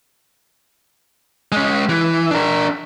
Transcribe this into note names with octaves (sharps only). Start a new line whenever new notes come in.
G#3 C#4
E3
D4 A#4